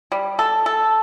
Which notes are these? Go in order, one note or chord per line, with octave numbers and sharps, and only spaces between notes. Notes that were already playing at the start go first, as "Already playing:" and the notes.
G3
A4
A4